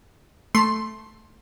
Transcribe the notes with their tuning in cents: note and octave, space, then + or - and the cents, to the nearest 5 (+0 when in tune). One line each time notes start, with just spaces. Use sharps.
A3 +0 C6 +10